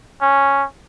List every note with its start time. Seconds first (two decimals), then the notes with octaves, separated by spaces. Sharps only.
0.21 C#4